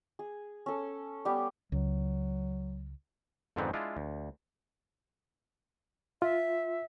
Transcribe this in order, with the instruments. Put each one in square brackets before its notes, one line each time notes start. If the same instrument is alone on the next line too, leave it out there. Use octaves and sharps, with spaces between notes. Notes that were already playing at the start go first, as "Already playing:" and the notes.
[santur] G#4
C#4 A4
G3 B3 G4
[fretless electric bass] C#2 [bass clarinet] F#3
[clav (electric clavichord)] F2 G#2 D3 D#3 B3 C4
G#3 D4 E4 F4
D2
[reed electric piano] F4 [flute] E5